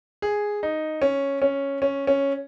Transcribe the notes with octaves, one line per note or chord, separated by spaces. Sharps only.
G#4
D#4
C#4
C#4
C#4
C#4